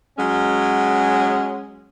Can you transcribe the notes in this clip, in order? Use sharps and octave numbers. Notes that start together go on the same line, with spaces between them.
F#3 G#3 C#4